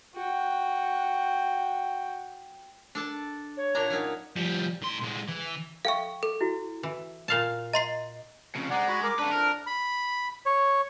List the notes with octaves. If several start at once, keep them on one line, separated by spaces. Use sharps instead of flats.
F#4 G5
D4 A4 A5
C#5
A#2 D4 A#5
F#3 C#4 D#4
F3 G3
A2 C6
A#2 G#3
E3
A4 E5 F5 G5 C#6
A4
E4 F#4
E3
A#2 F5 A5
D#5 A#5 C6 C7
F2 C#3
G#2 D3 G#3 D5 F#5 A#5
F#4 B5
A#4 A#5 C6 D6
A3 D4 B4
F2 E3 A#4 F6
B5
C#5